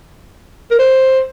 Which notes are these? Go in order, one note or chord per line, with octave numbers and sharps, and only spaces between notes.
A#4
C5